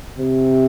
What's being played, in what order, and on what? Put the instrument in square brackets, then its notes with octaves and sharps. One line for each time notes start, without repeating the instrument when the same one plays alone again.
[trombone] C3